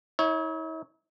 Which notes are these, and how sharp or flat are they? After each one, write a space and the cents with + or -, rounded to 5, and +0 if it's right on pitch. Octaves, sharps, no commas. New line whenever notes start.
E4 -45 C#5 +0